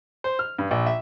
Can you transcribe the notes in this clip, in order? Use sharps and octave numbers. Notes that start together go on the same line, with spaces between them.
C5
F6
G2
A#1
E5